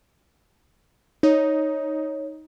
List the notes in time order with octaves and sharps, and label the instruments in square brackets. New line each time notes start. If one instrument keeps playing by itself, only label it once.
[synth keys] D#4 [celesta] C#5